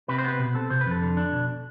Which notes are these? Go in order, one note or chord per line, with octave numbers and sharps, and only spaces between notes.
C3 B4
C5
B3 B4
B2
C4 A4
C3 C5
B4
F2 A4
D3
D4
B2